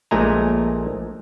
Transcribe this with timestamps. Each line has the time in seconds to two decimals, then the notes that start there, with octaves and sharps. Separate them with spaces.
0.11 A#1 A#2 G#3 A3 G#5 A#5